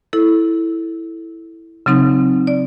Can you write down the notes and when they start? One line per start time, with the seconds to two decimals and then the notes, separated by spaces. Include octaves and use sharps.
0.13 E4 A4
1.86 C#3 F#3 C4 D#4
2.47 D5